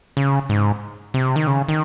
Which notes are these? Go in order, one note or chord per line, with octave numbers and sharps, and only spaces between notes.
C#3
G#2
C3
D#3
C#3
D#3